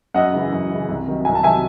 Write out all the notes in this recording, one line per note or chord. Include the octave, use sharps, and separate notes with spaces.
F#2 D#5 F#5
C#3 E3
F#2
C#3 E3
C2
C3 D#3 F#3
C2 G#5
A5
C3 D#3 F#3 E5 G#5